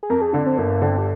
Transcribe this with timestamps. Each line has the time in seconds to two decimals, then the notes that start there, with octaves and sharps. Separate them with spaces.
0.03 G#4
0.10 F2 A#4
0.21 G#4
0.33 D3 D4
0.46 C4
0.58 G1 A#3
0.81 D3 C4
0.98 G4